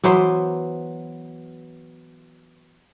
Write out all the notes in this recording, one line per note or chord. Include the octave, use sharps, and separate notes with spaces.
E3 F#3 B3 C5